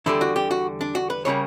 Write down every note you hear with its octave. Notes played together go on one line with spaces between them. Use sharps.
E2 D3 G3 E4
F#4
G4
F#4
D4
F#4
B4
C#3 G3 A#3 C#5